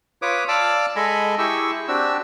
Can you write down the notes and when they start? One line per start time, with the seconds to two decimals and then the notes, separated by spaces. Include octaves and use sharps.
0.22 F4 B4 C#5 D6 D#6
0.48 D5 F5 A5 D6 E6
0.96 G#3 A4 D#5 G#5 B5
1.38 E4 G4 G#4 C#6 E6
1.88 C4 D4 F#4 G4 E6